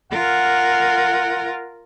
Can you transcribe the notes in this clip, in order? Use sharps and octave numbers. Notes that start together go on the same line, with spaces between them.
F4 A#4 F#5